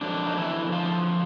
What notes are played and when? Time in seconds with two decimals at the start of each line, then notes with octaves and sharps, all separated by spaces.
0.01 F2 D3 F#3 D4
0.27 D#4
0.37 E3 E4
0.72 F3 F4